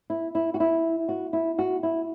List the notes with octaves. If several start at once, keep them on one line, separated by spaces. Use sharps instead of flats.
E4
E4
F#4
E4
F#4
E4
F#4
E4